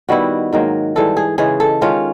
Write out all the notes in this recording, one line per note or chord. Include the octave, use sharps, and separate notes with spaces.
D#3 G3 B3 E4 F#4
G#2 D#3 F#3 A#3
G#2 E3 G3 A4
G#4
C#3 E3 G#3 G#4
A4
D#3 G#3 C#4 F4